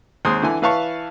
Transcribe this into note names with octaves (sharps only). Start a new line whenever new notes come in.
D#2 G#3 C4 C6 D#6
D3 E3 G#5
E3 B4 F5 A5 C#6